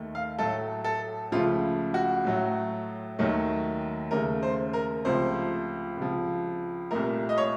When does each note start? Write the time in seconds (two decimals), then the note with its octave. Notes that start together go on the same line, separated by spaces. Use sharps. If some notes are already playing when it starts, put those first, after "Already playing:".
Already playing: D#2 D#3 A3
0.15 F5
0.39 A2 F#3 A3 A4
0.84 A4
1.32 C#2 C#3 F3 A3 F4
1.94 F#4
2.25 A2 F#3 A3
3.19 D#2 D#3 F#3 A3
4.11 D#2 C#3 A3 A#4
4.43 C5
4.73 A#4
5.05 C#2 C3 F3 A3 C5
5.97 C#2 C3 F3
6.91 C2 A#2 A3 A#4
7.29 D#5
7.38 C#5